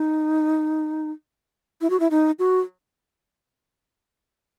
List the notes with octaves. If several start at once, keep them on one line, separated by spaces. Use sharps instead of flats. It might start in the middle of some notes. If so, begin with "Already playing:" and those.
Already playing: D#4
E4
F#4
E4
D#4
F#4